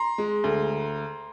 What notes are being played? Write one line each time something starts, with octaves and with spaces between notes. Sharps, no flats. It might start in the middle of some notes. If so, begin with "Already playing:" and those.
Already playing: A#5 C6
G#3
D2